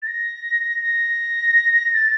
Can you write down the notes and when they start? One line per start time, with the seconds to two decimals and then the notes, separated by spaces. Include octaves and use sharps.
0.02 A6
0.07 A#6
0.82 A#6
1.94 A6